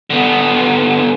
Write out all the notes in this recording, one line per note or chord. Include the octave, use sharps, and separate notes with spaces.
D3 B3